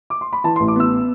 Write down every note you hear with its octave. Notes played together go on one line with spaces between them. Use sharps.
D6
C6
B5
E3 A5
C6
A1
D6
B3 E6